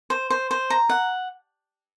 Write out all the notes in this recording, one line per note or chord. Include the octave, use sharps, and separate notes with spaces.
C5
C5
C5
A#5
F#5